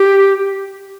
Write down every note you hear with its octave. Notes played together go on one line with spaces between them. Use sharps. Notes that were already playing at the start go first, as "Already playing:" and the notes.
Already playing: G4